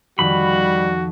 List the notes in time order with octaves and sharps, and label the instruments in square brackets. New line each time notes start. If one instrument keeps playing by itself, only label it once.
[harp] F2 D#3 [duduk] G3 [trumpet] F#4 [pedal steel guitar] B5